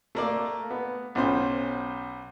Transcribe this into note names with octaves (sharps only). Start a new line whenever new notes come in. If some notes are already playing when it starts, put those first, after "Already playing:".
A3 A#3 D5
B3
B1 C#4 F4 C5